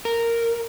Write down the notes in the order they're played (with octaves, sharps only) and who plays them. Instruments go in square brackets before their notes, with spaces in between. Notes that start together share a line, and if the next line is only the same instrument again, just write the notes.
[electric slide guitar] A#4